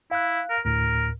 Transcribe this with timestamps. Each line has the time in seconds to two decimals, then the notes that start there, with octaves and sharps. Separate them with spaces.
0.11 E4 F5 F#6
0.50 A#4
0.65 D2 A2 A#4